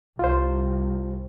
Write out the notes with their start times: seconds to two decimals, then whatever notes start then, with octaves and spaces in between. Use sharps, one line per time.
0.19 C2 F4 C5